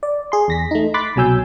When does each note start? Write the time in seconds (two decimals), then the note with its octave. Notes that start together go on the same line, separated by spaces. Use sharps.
0.03 D5
0.32 G#4 C6
0.48 E2 A#6 B6
0.71 A3 D#4
0.94 B5 C6 D6 F#6 A6 B6
1.16 C2 B2 F#3 G#5 E6 G6